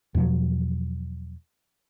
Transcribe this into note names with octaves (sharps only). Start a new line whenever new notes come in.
E2 B2 F3 F#3